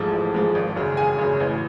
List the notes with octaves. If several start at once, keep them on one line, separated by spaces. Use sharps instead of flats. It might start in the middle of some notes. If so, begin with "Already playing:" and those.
Already playing: A1 G#2 F3 G#3 A4 A5
A1
G#2 F3 G#3
G#1
F#2 C#3
G#1 G#4 G#5
F#2 C#3
A1